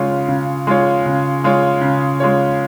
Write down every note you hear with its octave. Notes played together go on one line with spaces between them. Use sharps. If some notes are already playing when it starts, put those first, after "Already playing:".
Already playing: C#3 G#3 F4 C#5
C#3
G#3 F4 C#5
C#3
G#3 F4 C#5
C#3
G#3 F4 C#5